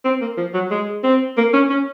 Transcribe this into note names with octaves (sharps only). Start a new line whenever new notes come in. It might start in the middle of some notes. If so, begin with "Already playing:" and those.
C4
A#3
F3
F#3
G#3
C4
A#3
C#4
C#4